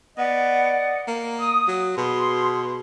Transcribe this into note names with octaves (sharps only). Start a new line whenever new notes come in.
B3 D5 D#5 F#5
A#3
D#6
F#3
B2 G#4 C6